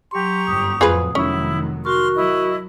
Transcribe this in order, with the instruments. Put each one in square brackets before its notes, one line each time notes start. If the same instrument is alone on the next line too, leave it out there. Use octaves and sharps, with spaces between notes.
[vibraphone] F#3 C6 [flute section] G4 A#5 C#6
[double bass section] G1 F#2 [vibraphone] D#6
[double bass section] F2 A2 F#3 [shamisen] F4 G#4 B4
[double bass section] F1 D#3 F#3 [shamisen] C#4 [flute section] E4
[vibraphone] F#4 A#4 C#6 [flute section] C6 F6
[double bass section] F#3 [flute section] E4 D#5